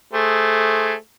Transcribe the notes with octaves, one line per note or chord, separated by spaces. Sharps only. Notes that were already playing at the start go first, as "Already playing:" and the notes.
A3 G#4 C5